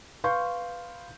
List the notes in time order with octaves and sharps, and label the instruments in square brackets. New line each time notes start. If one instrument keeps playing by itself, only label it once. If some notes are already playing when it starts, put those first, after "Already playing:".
[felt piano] B4 F5 C6 C#6 G6